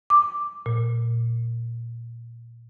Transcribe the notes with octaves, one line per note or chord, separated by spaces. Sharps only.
D6
A#2